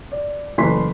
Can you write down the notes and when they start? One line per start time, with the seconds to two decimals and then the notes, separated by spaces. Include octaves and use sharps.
0.12 D5
0.58 F#1 E3 A3 B4 C6 B6